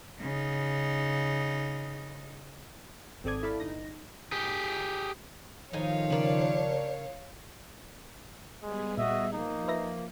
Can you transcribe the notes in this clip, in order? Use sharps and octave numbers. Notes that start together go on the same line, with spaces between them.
C#3 D#4
G#1 C4 A4 D5 D#6 G#6
E4 A4 D5 F5 A5 B5
G1 D#4 A#6
G4 G#4
A2 D#3 F3 D#4 C#5 F5 G#5
C#3 G3 D4 A#4
G3 G#3 B3 G#4
A#2 F#4 D#5 E5
F3 A#3 D#4
B4 E5 A#6